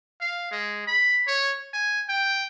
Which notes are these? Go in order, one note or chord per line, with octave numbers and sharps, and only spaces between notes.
F5
G#3
B5
C#5
G#5
G5